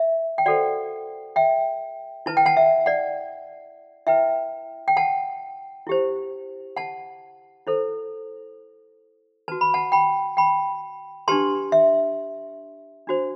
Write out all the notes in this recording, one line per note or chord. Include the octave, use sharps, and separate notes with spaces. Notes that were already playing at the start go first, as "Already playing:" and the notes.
Already playing: E5
G5
F#4 A4 C5 D5 F#5
E5 G5
E4 B4 A5
G5
F#5 A5
E5
D5 F#5
E4 B4 E5 G5
G5
F#5 A5
E4 G4 C5
F#5 A5
E4 A4 C5
F#4 B4 A5
B5
F#5 A5
G5 B5
G5 B5
D4 G4 B4 A5 C6
E5
D4 F#4 C5